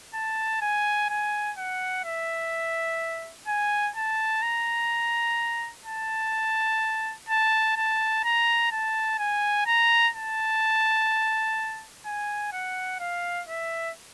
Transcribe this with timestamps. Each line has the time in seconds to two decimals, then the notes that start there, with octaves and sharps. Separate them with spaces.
0.14 A5
0.62 G#5
1.10 G#5
1.58 F#5
2.05 E5
3.48 G#5
3.96 A5
4.43 A#5
5.86 A5
7.29 A5
7.76 A5
8.24 A#5
8.72 A5
9.19 G#5
9.67 A#5
10.15 A5
12.06 G#5
12.53 F#5
13.00 F5
13.48 E5